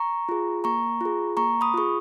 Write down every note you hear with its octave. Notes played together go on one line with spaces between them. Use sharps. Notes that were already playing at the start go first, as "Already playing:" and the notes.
Already playing: A#5 C#6
F4 G#4
A#3 A#5 C#6
F4 G#4
A#3 A#5 C#6
B5 D#6
F4 G#4 C#6